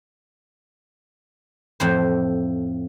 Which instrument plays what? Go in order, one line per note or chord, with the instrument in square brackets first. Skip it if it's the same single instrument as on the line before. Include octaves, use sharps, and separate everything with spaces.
[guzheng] F2 A2 C5